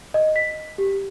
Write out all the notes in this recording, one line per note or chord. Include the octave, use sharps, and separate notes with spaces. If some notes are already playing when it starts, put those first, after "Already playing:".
D#5
B6
G4